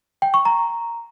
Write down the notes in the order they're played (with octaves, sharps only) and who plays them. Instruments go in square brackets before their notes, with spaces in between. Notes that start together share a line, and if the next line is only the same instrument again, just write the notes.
[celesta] G5
C#6
A#5